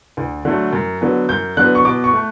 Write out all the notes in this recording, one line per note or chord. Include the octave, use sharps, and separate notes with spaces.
D2
D3 F#3 A3
F#2
D3 F#3 B3
F#2 G6
D3 F#3 B3 F#6
C#6
B2 D6
C#6
A3